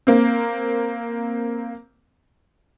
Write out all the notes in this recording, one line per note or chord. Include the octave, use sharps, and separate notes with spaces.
A#3 C4